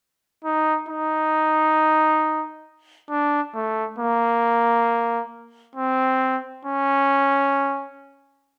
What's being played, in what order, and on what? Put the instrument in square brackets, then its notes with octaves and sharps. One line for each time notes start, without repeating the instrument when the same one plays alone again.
[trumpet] D#4
D#4
D4
A3
A#3
C4
C#4